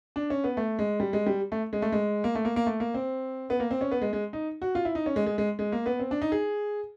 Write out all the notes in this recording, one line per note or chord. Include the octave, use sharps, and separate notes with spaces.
D4
C#4
B3
A3
G#3
G3
G#3
G3
A3
G#3
A3
G#3
A#3
A3
A#3
A#3
A3
A#3
C4
B3
A#3
C4
C#4
B3
G#3
G#3
D#4
F#4
F4
E4
D#4
C#4
G#3
G#3
G#3
G#3
A#3
B3
C4
D4
D#4
G#4